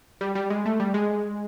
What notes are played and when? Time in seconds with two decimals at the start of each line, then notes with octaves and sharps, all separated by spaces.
0.21 G3
0.35 G3
0.50 G#3
0.66 A3
0.80 G3
0.94 G#3